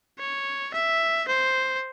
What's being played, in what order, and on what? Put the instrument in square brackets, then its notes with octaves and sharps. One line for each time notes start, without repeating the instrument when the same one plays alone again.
[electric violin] C#5
E5
C5